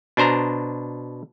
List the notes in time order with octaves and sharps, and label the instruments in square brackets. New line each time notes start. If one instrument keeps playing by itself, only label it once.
[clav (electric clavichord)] B2 D4 C5 A#5